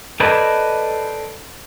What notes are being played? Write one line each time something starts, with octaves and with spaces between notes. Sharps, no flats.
A4 B4 C5 D5 D#5 G#5